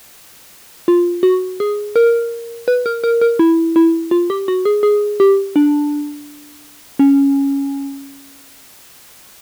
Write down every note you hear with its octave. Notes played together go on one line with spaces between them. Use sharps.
F4
F#4
G#4
A#4
B4
A#4
A#4
A#4
E4
E4
F4
G4
F#4
G#4
G#4
G4
D4
C#4